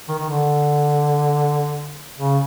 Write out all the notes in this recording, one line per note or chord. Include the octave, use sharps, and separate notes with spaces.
D#3
D#3
D3
C#3